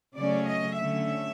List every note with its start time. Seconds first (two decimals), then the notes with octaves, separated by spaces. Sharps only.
0.16 C#3 F#3 A3 C#4 D5
0.48 D#5
0.79 D3 F#3 A3 C#4 E5